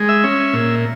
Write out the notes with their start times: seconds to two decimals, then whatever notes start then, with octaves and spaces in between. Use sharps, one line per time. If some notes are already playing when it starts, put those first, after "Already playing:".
Already playing: G#3
0.09 E5
0.24 C#4
0.54 A#2